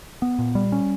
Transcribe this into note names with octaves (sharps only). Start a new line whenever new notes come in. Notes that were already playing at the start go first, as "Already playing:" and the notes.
B3
A#2
G3
C#4